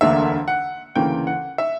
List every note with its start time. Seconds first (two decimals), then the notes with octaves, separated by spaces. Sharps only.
0.01 E1 D2 D3 A#3 E5
0.48 F#5
0.95 D2 C#3 E3 A#3 G5
1.27 F#5
1.58 E5